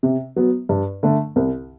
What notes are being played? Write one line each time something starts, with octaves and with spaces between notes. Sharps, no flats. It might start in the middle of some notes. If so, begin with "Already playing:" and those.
C3
F#3 B3
G2
D3 A3
C2